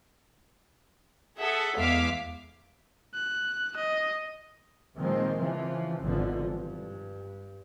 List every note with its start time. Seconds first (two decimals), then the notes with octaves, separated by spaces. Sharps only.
1.40 G#4 A4 E5 F#5
1.79 E2 G#3 E5 F5 D6 B6
3.14 F#6
3.76 D#5
4.97 A#2 D#3 F3 G#3 A#3 C4
5.39 C#3 E3 F3
6.01 G#1 B2 D3 E3 F3
6.50 G2